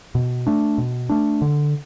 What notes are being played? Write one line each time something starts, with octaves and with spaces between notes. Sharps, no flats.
B2
A3 D4
B2
A3 D4
D3